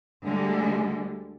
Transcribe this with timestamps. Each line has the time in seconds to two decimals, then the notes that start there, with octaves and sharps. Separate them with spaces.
0.24 D2 D3 G3 G#3